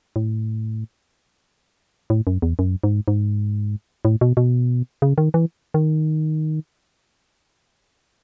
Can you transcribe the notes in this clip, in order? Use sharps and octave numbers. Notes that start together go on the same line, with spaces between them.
A2
A2
F#2
E2
F#2
G#2
G#2
A2
B2
B2
C#3
D#3
E3
D#3